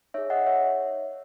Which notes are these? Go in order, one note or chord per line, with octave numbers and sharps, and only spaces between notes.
D#4 G#4 C#5 E5
D#5 F#5
C#5 E5